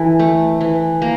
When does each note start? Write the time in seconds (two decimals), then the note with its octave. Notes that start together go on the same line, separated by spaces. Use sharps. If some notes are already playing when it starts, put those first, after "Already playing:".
Already playing: E3 E4 A4
0.19 A3
0.61 E3
1.02 A#3